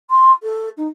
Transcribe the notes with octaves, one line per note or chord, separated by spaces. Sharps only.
C6
A4
D#4